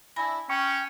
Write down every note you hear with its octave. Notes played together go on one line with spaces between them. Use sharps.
D4 E4 G#5 B5 A#6
C#4 G5 C#6 C#7